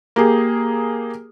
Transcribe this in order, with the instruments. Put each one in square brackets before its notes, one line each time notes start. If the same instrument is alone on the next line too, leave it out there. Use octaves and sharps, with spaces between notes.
[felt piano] A#3 G4 G#4